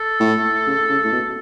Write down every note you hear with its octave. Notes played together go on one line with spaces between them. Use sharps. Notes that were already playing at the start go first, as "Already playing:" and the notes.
Already playing: A4
A2
C#3
C#3
A2
B2